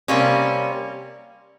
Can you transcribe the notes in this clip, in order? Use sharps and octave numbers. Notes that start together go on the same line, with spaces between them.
C3 G3 A#3 C#4